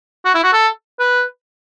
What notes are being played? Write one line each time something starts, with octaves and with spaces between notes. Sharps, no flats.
F#4
E4
F#4
A4
B4